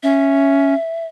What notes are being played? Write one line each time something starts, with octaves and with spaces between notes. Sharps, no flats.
C#4 E5